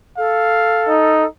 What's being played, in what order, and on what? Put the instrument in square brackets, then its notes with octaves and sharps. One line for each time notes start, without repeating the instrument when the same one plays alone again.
[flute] A4 [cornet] F5
[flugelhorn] D#4